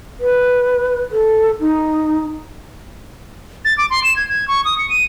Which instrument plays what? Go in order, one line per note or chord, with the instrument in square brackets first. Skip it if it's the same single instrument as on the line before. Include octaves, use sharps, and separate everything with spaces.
[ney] B4
A4
D#4
[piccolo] A6
D6
C6
E7
G#6
G#6
C#6
D#6
C#7
D#7